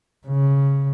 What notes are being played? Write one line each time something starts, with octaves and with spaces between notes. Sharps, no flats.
C#3